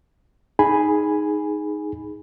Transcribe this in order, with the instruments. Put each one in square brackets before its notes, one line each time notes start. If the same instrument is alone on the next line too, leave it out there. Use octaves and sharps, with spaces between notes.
[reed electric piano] D#4 G#4 G#5 B5